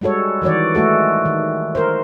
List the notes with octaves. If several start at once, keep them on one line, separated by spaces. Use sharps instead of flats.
G3 G#3 F#4 A4 C#5
D#3 E3 F#4 C#5 D5
G#3 A3 F#4 A4
D#3
A#4 C5